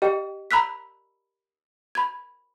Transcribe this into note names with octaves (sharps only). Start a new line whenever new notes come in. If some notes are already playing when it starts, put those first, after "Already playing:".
G4 D#5 G5
A#5 B5 E6 F#6 B6
B5 G#6